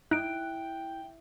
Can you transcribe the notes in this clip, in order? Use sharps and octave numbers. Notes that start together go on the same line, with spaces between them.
D#4 E4 G5 F#6 D7